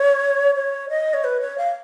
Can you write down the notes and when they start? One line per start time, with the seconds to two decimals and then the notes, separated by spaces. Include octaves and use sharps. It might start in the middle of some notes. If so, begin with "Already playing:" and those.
Already playing: C#5
0.55 C#5
0.89 D#5
1.14 C#5
1.24 B4
1.41 C#5
1.58 F5